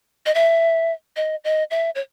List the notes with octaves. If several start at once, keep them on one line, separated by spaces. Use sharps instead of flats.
D#5
E5
D#5
D#5
E5
C#5